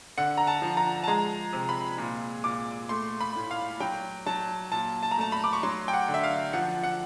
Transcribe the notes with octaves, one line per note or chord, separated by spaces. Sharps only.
D3 F#5
A#5
A5
F3
A#5
A5
G#3 A#5
C3
B5
A#2
A#2 D6
A3 C6
B5
A2
F5
F#3 G5
F#3 A5
A#2 A5
A5
A#5
A3 A5
B5
D6
C#6
F#3 C6
G5
F#5
D3
E5
F5
F3 F#5
F#5